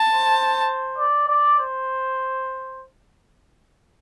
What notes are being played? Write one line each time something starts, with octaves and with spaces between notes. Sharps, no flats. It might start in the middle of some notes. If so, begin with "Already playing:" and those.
Already playing: A5
C5
D5
D5
C5